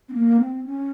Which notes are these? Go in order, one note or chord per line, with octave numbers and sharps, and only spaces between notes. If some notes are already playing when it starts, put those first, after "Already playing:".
C4
A#3
C4
C#4